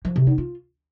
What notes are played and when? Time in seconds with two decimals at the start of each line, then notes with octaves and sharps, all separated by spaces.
0.05 F3
0.16 C3
0.27 D#4
0.38 F4